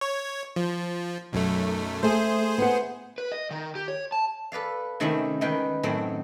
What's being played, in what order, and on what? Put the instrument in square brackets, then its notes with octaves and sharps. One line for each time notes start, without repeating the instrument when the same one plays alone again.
[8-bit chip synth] C#5
F3
B1 F#2 A3
[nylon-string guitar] A3 [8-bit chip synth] G#4 C5
[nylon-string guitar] B3 B4 F#5
[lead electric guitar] B4
D#5
D#3
G4
C#5
A5
[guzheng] A4 B4 D5 F5
C3 D#3 A3 C4 C#4 E4
E2 D#3 G#3 A#4 B4 G5
F#2 A2 D#3 F#3 C4 A4